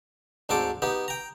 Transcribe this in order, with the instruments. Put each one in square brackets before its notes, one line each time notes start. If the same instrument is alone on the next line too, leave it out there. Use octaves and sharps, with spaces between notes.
[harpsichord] D2 G#2 C4 A4 G5 D6
B3 D#4 G4
G5 A#5